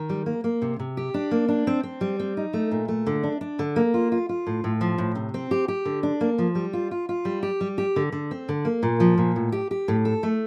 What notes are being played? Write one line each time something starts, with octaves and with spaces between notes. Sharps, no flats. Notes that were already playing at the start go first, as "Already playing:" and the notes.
Already playing: D#3
G3
A#3
A#3
C3
C3
G4
D4
A#3
D4
C4
C4
G3
C4
D#4
A3
A#2
A3
D3
D4
D4
D3
A#3
F4
F4
F4
A2
A2
F3
A2
C3
C4
G4
G4
D3
D4
A#3
F3
G3
F4
F4
F4
G3
G4
G3
G4
D3
D3
C4
D3
A#3
A#2
F3
A#2
A2
G4
G4
A2
A4
A3